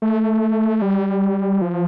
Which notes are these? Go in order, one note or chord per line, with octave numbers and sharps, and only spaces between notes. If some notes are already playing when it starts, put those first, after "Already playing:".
A3
G3
F3